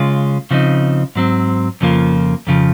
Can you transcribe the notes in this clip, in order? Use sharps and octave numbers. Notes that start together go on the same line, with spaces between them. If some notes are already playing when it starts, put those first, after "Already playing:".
Already playing: C#3 G#3 C#4 F4
C#3 F3 C4 D#4
G#2 F#3 C4
F2 C#3 F3 A#3 F4
F2 C#3 F3